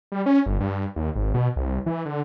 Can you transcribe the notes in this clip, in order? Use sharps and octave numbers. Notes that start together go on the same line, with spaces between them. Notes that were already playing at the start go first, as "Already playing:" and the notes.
G3
C#4
G1
G2
D#2
G#1
B2
C2
E3
D3